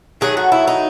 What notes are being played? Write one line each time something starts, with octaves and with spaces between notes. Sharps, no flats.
D#3 F#3 A3 G#4
F#4
E4
D#4